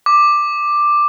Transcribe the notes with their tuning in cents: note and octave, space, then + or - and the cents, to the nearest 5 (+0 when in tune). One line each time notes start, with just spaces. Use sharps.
D6 +10